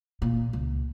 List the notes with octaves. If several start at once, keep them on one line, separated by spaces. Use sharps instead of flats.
A#2
C#2